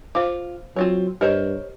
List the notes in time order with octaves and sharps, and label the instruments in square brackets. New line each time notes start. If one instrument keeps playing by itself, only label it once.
[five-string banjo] F4 [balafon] C5 F5 D6
[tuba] F#3 [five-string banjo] C4 F4 C#5
[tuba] G2 [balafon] G4 D#5 [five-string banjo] A#4 C5 C#5